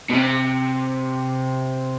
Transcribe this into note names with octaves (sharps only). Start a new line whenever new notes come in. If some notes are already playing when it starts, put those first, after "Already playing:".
B2
C3